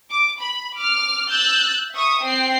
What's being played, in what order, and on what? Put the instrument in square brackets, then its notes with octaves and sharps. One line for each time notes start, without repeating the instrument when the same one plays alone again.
[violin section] D6
B5
D6 F6
E6 F#6 G6 A6
E5 C#6 D#6
C4 G5 C7